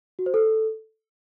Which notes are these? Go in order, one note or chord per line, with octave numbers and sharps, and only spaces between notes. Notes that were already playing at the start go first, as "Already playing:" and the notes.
F#4
C5
A4